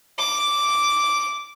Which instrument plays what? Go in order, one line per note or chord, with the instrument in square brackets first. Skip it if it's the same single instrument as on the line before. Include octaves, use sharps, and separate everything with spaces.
[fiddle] D6